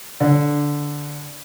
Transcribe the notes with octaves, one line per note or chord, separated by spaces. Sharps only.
D3